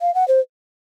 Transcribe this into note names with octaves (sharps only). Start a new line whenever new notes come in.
F5
F#5
C5